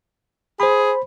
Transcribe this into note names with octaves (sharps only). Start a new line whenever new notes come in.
G#4 C5 B5